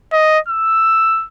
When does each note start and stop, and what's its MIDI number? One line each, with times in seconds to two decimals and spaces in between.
0.13 0.39 75
0.48 1.26 88